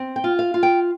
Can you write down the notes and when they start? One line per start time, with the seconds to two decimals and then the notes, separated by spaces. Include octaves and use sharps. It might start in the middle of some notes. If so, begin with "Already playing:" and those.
Already playing: C4
0.16 G5
0.24 F4
0.39 F5
0.54 F4
0.63 G5